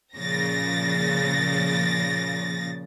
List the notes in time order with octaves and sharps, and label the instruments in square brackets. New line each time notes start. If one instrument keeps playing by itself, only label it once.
[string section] A#2 C#3 F3 A6 A#6